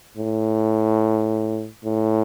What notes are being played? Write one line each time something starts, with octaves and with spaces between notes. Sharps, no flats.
A2
A2